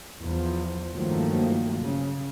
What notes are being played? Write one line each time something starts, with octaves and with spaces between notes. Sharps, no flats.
E2 F3
G2 D#3 F3 F#3 A3 A#3
C#3